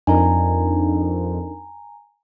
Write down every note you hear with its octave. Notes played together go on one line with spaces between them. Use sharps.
F2 D4 D#4 A#4 G#5 A#5